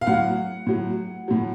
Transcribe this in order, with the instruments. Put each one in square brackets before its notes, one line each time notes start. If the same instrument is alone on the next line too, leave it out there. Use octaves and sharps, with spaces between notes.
[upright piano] F5
A2 F#3 F#5
A2 F#3
A2 F#3